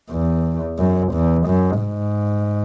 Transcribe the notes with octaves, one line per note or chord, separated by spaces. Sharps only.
E2
F#2
E2
F#2
G#2